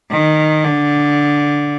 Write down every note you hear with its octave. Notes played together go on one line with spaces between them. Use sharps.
D#3
D3